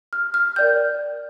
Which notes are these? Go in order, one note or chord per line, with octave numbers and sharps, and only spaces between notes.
F6
F6
A#4 D5 G5 G6